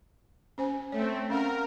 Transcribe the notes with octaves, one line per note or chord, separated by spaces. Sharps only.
C#4 C5 G#5
A3 C4 C#5
C#4 A#4 F5 F#5